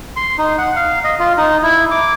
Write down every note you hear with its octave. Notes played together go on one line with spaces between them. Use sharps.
C6
D#4
F#5
F5
D#5
F4
D#4
E4
D6